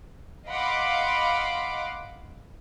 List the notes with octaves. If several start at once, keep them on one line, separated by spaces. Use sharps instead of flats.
D#5 F5 F#5 B5 C6 D6